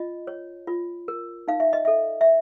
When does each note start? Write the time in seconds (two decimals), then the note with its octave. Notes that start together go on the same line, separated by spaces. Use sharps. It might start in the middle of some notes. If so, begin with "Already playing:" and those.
Already playing: F4 D#5
0.27 C#5
0.67 F4
1.08 A#4
1.48 D#4 F5
1.60 E5
1.73 D#5
1.85 A4 E5
2.21 E5